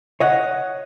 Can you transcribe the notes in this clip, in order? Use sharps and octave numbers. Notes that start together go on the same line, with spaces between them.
C#5 D#5 F#5